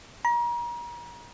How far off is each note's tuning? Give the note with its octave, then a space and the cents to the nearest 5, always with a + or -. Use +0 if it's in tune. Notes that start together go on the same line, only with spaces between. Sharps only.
A#5 +35